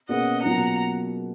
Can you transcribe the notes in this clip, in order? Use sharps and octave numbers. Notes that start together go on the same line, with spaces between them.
B2 A#3 C#4 G#4 B4 D#5 F#5
B2 F#3 A#3 F4 F#5 A#5